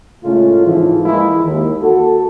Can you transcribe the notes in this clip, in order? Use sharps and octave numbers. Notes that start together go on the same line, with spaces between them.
A2 C#3 G#3 A3 C#4 F4
G#2 E3 F3
G#3 A#3 E4
D#2
F#4 A4